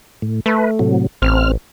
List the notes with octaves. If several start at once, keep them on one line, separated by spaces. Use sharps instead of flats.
A2
A3 B4
A2 C3 F#3
A1 C4 F6